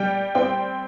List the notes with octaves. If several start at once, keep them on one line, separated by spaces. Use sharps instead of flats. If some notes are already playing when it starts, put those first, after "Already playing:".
Already playing: G3 G5
C4 G5